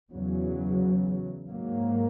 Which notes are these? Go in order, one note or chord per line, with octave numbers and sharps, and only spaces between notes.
E2 C#3 F#3
G#2 F#3 A#3